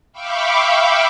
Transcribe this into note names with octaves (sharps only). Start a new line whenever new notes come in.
E5 F5 G5 B5 C#6 D6